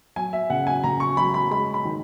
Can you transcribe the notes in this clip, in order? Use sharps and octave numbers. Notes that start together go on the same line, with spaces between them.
F#3 G#5
E5
C#3 F#5
G#5
C#3 A#5
C#6
F#3 B5
B5
G#3 B5
B5
D#3